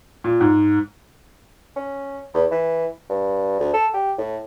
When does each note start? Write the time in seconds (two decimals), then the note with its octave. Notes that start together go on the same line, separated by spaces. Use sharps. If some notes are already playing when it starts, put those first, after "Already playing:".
0.24 A#2
0.41 G#2
1.76 C#4
2.34 E2
2.51 E3
3.10 G2
3.60 D2
3.74 A4
3.94 G4
4.18 A2